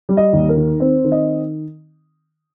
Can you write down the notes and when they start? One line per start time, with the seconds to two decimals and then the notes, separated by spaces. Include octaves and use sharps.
0.09 G3
0.17 D#5
0.33 D#2
0.49 A#4
0.56 D#3
0.80 C4 C5
1.04 D#3
1.12 D#5